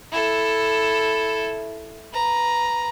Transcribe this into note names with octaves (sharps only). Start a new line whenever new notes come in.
E4 A4
B4 A#5